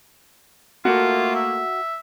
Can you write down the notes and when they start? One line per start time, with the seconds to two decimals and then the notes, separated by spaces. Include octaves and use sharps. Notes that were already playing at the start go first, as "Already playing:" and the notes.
0.85 A3 A#3 F4 F#4
1.36 E5